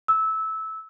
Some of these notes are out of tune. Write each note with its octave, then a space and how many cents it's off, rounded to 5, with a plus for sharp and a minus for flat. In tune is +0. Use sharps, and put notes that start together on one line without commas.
E6 -15